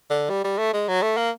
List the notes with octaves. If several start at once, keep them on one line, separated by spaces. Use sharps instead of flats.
D3
G3
G3
A3
G#3
F#3
A3
A#3